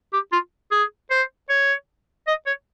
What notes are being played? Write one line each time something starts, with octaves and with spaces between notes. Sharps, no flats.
G4
F4
G#4
C5
C#5
D#5
C#5